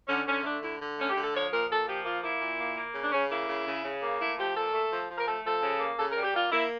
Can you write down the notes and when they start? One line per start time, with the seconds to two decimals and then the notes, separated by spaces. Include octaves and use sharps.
0.08 D3 C#4
0.26 D3 C#4
0.44 A3 D4
0.62 D3 E4
0.80 D3
0.97 A3 C#4
1.10 G4
1.16 D3
1.22 A4
1.34 F3 C#5
1.51 A#2 A#4
1.69 A#2 A4
1.87 F3 G4
2.05 A#3 F4
2.24 A#3 E4
2.40 A#2
2.59 A#3
2.77 A#3
2.94 C#3
3.02 D4
3.12 C#3 C#4
3.30 A#3 E4
3.49 C#3
3.67 C#3
3.84 C#3
4.02 A#3
4.20 A3 E4
4.37 F3 G4
4.55 A#2 A4
4.74 A3
4.91 F3
5.10 F3
5.18 A#4
5.27 A3 A4
5.44 F3 A4
5.62 C#3
5.80 A#3
5.98 C#3 A4
6.11 A#4
6.17 G3
6.23 G4
6.34 A#3 F4
6.52 A#3 E4